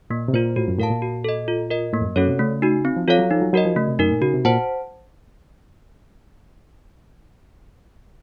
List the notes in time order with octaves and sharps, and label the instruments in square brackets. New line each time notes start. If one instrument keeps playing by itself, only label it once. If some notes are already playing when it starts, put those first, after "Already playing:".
[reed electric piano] A#2 [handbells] A#3
[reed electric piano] C3
[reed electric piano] A#2 [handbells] F4 C5
[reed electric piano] A2 [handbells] F#4
[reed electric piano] F#2
[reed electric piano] A2 [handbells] A#4 F5 A5
[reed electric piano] A#2
[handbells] F#4
A4 D#5
F4
A#4 D#5
[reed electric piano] A2 [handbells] A#3
[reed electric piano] F2
F#2
[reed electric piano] F#2 [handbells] C#4 F#4 A4 C#5
[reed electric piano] C3
[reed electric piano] C#3 [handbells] A3
[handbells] D#4 F#4
C4
[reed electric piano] F3
[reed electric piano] F3 [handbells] F4 A4 C#5 F5
[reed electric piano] F#3
[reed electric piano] F3 [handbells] D#4
[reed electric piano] F#3
[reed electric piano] F#3 [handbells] F#4 A#4 D#5
[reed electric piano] F3
[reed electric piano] C#3 [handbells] A3
[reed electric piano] C3
[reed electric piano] F#2 [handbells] D#4 A#4
[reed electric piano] A#2
[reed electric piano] C#3 [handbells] F#4
[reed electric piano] C3
[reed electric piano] A#2 [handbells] C5 F#5 A5